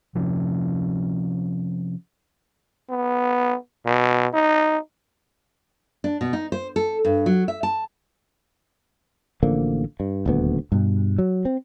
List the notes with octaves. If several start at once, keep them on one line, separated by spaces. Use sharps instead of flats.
C3 F3 C#4
B3
B2
D#4
D4
B2
D#4
C5
A4
G2
F#3
E5
A5
A1 D3 F3 A#3
G2
D#1 D2 B3
G2 B2
F#3
C4